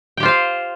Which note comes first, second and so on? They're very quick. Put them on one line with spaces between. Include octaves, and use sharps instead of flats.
G5 G4 F4 C5 F5